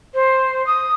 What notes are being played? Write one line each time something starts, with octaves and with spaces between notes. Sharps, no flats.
C5
D#6